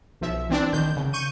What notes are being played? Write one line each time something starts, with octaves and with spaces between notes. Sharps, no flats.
B1 F3 E5
E3 C4 D4
A#1 D#3 G6
C#3
C#6 G6 D#7